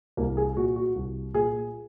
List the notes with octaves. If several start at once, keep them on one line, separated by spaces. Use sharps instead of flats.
C2 A#3
G#4
A#2 F#4
F#4
C2
A#2 G#4